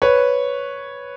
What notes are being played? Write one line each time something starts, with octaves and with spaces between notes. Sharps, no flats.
B4 C#5